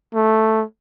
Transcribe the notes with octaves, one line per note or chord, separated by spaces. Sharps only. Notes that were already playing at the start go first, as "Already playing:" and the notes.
A3